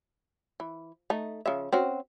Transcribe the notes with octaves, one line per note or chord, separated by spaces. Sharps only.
E3
A3 D#4
C#3 F3 E5
C4 C#4 F#4